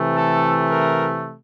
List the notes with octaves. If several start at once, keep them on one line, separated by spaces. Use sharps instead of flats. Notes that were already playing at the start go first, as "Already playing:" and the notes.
Already playing: C3 E3 A3
A4
A#4